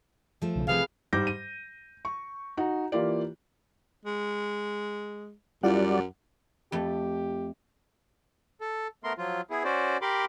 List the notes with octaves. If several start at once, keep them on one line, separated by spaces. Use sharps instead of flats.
F3 A3
B1 C#3
C3 F3 A3 G#4 B4 F5
G#2 G3 D6 G6 A#6
D#7
C#6
D#4 F#4
E3 A#3 F4 G4 D5
G#3
F#2 G3 E4 F4 D5 F#5
F2 A3 G4
A4
A3 B3 A#4 C6
F3 F#3 F4
B3 E4 G#4
C#4 F#4 C5 D5
G4 A#4 B5 C6 D6